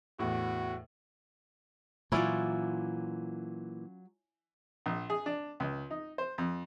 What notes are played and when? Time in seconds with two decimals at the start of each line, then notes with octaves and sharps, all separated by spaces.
0.19 E2 A2 F#4
2.12 A#2 E3 F#3 C#4 E4 F4 D5
4.86 A#1
5.10 G#4
5.26 D4
5.60 C#2
5.90 D#4
6.18 C5
6.38 F2